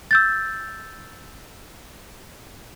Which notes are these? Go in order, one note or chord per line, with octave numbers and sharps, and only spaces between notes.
E6 G6 A6